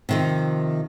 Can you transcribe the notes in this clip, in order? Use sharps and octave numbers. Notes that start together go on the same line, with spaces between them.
C3 D#3 F3